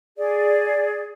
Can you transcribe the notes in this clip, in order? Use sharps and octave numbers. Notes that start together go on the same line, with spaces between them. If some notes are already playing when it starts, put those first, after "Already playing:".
G#4 D5